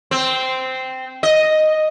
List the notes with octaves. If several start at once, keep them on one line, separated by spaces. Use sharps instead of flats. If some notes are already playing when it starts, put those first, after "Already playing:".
C4
D#5